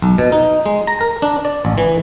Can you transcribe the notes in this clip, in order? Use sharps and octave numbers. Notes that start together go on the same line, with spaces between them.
B1
B2
D#4
G#3
A#5
A#4
D4
D5
A1
E3